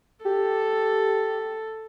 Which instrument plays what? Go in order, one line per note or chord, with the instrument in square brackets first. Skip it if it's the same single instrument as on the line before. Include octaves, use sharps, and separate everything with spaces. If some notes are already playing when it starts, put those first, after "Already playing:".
[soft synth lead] G4 [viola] A4